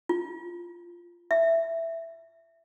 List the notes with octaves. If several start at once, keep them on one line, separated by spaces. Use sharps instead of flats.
F4
E5